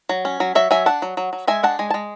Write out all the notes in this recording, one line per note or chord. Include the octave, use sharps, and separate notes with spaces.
F#3
C#4
F#3
F#3 C#5 E5
F#3 E5 G#5
D4 F#5 A5
F#3
F#3
F#3
G#3 E5 G#5
D4 F#5 A5
G#3 G#5
G#3 A5